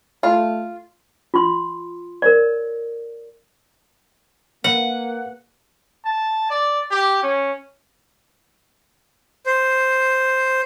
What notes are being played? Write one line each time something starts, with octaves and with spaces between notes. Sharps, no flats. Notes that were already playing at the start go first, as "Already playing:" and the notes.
A3 F4
F4 C6
A#4 C#5 D5
A#3 B4 F#5
A5
D5
G4
C#4
C5